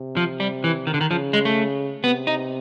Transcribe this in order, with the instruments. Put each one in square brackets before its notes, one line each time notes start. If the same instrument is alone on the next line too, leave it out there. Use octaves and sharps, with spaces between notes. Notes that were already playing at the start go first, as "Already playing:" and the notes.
Already playing: [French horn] C3
[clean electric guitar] F3
G3
E3
D#3
D3
D#3
[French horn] C#3 [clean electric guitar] F3
[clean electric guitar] G#3
A3
[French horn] C3 [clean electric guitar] B3
[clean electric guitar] D#4